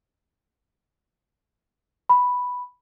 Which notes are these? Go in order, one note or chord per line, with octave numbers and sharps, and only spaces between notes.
B5